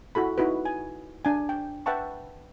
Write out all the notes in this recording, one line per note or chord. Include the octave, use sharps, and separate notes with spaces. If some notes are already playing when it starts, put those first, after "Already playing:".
E4 F#4 A4 B5
D#4 E4 F#4 B4
G#5
D4 G#5
G5
B4 E5 F#5 G5 A5 C#6